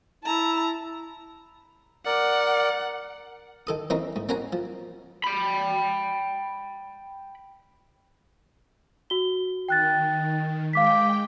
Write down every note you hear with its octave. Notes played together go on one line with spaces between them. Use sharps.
E4 A5 A#5
A#4 D5 F#5
D#3 A4 D#6
E3 C4 C#4 D#4 A#4
G#2
C4 C#4 A#4 F#5 G#5 A#5
F3
G5 B5
F#4 G7
D#3 G5 F#6 A6
G#3 F5 G5 D6 B6